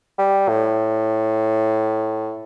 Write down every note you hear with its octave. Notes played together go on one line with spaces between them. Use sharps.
G3
A2